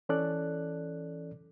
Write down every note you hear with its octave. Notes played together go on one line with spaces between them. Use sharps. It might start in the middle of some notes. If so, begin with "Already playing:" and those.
E3 C#4 A4 D5 F#6